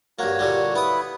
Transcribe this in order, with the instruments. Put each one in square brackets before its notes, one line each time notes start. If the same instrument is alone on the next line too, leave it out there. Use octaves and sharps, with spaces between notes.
[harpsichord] G2 A#3 [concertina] F#4 C#5
[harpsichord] A#2 D3 G3
[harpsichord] B3 D#6 [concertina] E4 B4